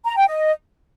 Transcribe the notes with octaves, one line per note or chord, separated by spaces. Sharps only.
A#5
G5
D#5